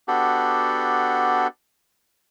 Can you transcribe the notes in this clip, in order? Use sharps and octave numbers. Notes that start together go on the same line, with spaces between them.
B3 D4 F#4 G4 A4